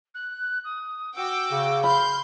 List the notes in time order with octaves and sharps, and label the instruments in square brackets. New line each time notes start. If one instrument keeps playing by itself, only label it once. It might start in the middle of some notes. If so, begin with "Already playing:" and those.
[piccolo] F#6
D#6
[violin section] F#4 G5 D6 [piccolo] E6
[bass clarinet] C#3
[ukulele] B5 [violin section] C6 G6 [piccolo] F6